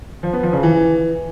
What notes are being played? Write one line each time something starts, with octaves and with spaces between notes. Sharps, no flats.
F3
B3
F3
C#3
E3